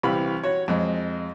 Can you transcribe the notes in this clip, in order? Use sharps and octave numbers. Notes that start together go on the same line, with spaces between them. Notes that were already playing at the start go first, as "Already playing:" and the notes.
C2 E3 G4 F5 B5
F#4 C#5
F2 G#3